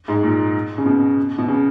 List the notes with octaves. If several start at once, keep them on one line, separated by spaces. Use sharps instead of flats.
G#2
A#2
C#3
B2
B2
C#3